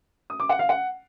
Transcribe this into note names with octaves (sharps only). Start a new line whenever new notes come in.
D#6
D6
F#5
F5
F#5